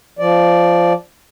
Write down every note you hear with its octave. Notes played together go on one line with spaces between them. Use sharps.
F3 D5